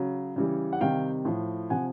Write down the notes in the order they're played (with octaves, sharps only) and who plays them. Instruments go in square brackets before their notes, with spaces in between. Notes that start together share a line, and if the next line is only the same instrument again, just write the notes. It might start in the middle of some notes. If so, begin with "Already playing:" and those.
Already playing: [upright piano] C#3 F#3
C#3 E3 G3
F#5
C3 D#3 G3 F5 G5
A2 F3
C3 F3 F#5 G#5